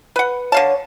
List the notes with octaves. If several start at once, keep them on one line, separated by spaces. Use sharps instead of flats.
B4 F#5
D3 C#5 F5 A5